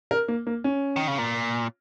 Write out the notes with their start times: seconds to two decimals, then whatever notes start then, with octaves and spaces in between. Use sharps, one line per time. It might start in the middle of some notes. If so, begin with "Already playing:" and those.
0.11 A#4
0.28 A#3
0.47 A#3
0.64 C#4
0.96 D#3
1.08 C#3
1.18 A#2